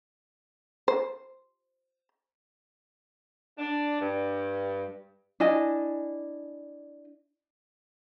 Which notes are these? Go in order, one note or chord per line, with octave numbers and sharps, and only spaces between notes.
C5
D4
G2
D4 E4 D#5 G#5